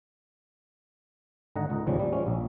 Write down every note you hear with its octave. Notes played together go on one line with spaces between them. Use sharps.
G#1 D3 D#5 F#5 A#5
C#2 D#4
A1 D#2 C#3 F3 G3
G3
F3 G#3 C#4
A#1